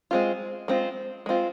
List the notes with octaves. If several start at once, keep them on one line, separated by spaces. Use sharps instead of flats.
G#3 C4 F4
G#3 C4 F4
G#3 C4 F4